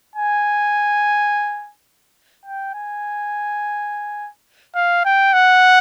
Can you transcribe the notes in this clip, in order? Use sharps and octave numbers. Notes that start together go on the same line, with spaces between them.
G#5
G5
G#5
F5
G5
F#5